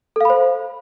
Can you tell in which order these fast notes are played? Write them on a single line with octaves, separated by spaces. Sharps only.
A4 F5 B5 C5